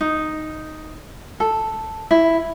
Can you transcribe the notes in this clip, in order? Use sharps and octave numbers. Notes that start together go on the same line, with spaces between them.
D#4
A4
E4